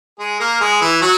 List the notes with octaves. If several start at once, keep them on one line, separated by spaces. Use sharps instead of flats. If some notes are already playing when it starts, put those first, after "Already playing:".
G#3 G#4
A#3 A#4
G#3 G#4
E3 E4
F#3 F#4